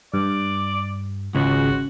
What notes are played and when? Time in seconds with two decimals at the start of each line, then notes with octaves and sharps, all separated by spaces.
0.14 G2 D5
1.35 G#1 C#2 C#3 C#4 F#4